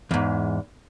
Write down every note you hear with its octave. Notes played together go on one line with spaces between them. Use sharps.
E2 G#2